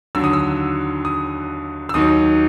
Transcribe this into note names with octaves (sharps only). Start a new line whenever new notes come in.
D#2 D3 F#3 E6
D#6
E6
D#6
E6
D#2 D#3 F#3 D#6